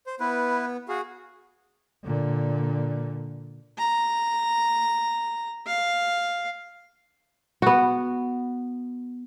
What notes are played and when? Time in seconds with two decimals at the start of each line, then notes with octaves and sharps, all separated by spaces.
0.07 C5
0.20 B3 E4 B4
0.89 F#4 G#4 F5
2.04 A#2 D3
3.78 A#5
5.67 F5
7.62 B3 F#4